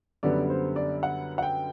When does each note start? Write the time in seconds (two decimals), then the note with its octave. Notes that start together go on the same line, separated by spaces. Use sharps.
0.23 F#2 D3 G3 B3 D5
0.50 C5
0.76 D5
1.03 F#5
1.38 F#5
1.42 G5